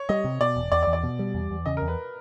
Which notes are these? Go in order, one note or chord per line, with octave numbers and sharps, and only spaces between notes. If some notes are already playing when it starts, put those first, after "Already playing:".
Already playing: C#5
G3 D#5
C3
B2 D5
E1
E2 D5
D5
E2
D5
B2
G3
E2
E2
C#3 D#5
A#4
E2
B4